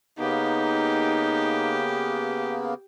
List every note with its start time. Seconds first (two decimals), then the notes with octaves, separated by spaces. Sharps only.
0.19 C#3 A#3 B3 D#4 G4